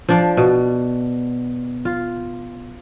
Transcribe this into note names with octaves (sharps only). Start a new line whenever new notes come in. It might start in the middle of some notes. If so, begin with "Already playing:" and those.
F3 D4
B2
F4